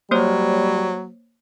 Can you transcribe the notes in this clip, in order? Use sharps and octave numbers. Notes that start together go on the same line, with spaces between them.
F#3 G3 A#3 C5 C#5